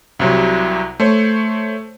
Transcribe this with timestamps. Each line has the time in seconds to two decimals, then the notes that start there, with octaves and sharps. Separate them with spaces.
0.19 C2 C3 F#3
1.00 A3 C5 C#5